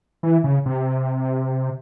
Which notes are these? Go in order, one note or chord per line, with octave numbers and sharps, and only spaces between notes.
E3
C#3
C3